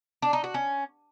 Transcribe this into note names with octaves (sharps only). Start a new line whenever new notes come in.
D4
D#4
F#4
C#4